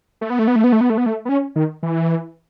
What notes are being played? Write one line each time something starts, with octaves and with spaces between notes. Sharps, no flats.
A3
B3
A3
B3
A3
B3
A3
B3
A3
B3
A3
B3
C#4
D#3
E3